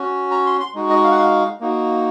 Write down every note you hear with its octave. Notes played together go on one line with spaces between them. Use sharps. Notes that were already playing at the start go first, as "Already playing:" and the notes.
Already playing: C#4 F#4
A#5
C6
C6
G#3 D#4 F#4
D#5
F5
F#5
F5
A#3 D#4 F#4